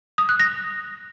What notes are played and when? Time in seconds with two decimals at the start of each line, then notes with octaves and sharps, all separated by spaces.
0.18 D#6
0.29 F#6
0.40 A#6